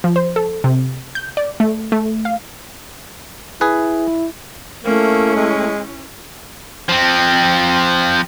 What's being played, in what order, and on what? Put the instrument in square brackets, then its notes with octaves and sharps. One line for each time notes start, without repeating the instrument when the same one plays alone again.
[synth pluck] F3
C5
A4
C3
G6
D5
A3
A3
F5
[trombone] E4 [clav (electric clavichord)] G#4 B4
[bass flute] A3 [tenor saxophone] A#3 [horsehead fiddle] C#4 E4
[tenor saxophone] G#3
[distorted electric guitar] F3 C4